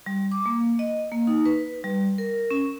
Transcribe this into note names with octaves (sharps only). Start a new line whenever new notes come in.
G3
D6
A#3
D#5
A#3
D#4
B4
B4
G3
A#4
C#4